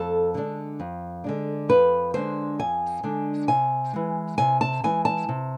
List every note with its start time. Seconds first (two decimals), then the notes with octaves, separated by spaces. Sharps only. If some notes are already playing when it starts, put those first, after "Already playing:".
Already playing: F2 A4
0.34 D3 G#3 D4
0.80 F2
1.24 D3 G#3 D4
1.69 F2 B4
2.14 D3 G#3 D4 C5
2.60 F2 G#5
3.03 D3 G#3 D4
3.48 C3 G#5
3.93 E3 G#3
4.38 C3 G#5
4.61 A5
4.84 E3 G#3 G#5
5.05 A5
5.29 C3